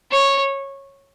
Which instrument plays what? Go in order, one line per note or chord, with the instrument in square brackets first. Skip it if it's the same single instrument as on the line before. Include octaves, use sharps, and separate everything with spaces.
[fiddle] C#5